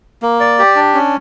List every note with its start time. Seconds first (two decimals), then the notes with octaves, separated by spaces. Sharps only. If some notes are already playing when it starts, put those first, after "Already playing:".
0.22 A#3
0.40 D5
0.59 G4
0.76 D4
0.94 C#4